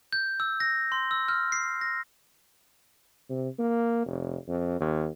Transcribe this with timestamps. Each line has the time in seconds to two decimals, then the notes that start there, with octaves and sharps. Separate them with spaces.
0.13 G6
0.40 E6
0.60 A#6
0.92 C6
1.11 E6
1.28 F6
1.52 C7
1.81 A#6
3.30 C3
3.59 A#3
4.06 F1
4.48 F2
4.80 D#2